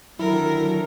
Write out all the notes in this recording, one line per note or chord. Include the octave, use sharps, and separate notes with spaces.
D3 D#3 F#3 E4 A4 A#4